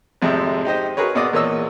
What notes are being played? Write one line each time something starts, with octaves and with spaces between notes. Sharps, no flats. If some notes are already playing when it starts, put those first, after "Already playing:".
G#1 F2 C3 G#3 A3
D#4 G4 C5 D#5
F#4 G#4 A#4 B4 C#5
G#1 B2 D5 D#5 D6 D#6
E2 A#2 A#3 C#5 D#5 E6